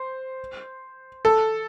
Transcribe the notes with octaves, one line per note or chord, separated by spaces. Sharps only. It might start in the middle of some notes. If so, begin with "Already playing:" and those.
Already playing: C5
A4